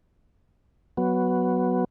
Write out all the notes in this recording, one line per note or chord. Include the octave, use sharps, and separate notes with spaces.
F#3 B3